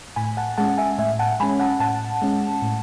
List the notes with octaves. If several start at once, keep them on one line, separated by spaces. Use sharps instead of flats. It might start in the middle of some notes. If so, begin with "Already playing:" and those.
A2 G#5 B5
F#5 A5
G#3 C#4 F#5 A5
E5 G#5
A2 E5 G#5
F#5 A5
G#3 C#4 G#5 B5
F#5 A5
A2 F#5 A5
G#3 C#4
A2